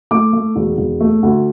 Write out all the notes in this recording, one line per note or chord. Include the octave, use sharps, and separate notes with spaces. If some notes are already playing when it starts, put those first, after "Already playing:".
A3 D6
A3
E1
E1
A3
D2